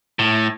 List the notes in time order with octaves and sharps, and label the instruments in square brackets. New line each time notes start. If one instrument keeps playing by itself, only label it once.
[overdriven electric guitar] A2